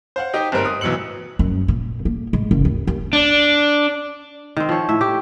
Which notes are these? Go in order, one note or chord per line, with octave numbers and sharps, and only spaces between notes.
C5 F5 F#5
D#4 G4 D#5 G5
G1 G#2 G3 C4 A#4
D#6
B1 E3 F#3 E6 C#7 F#7
F#2
A#2
A#3
G#2
F#1
D#2
D#2
D4
D#3 C4
F3 C#5
A2 E5
G4